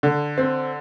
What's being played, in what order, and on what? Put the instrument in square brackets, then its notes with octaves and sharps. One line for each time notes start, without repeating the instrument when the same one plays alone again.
[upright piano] D3
C4